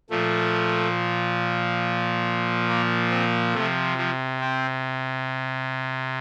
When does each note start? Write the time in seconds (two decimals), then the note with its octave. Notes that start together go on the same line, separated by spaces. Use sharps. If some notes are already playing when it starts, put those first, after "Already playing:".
0.10 A#2 F3 A3
2.69 A#3
3.11 C4
3.54 C3 F3 A3
3.98 F3
4.40 C4